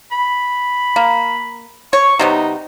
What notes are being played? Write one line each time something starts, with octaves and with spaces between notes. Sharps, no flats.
B5
A#3
C#5 C#6
C3 G3 B3 D#4